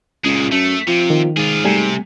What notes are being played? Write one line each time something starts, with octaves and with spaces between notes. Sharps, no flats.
C#2 A#2 G#3
F#2 A3
C3 F3
D#3
G#2 F4 G#4
C3 G3 A3 G#5